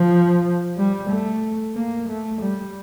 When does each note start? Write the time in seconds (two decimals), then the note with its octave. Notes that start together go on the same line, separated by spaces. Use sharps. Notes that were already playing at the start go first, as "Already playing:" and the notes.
Already playing: F3
0.77 G3
1.10 A3
1.76 A#3
2.09 A3
2.42 G3